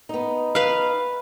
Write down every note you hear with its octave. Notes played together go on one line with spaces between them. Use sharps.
B3 D#4
B4 F5